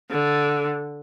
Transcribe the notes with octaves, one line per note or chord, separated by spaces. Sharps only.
D3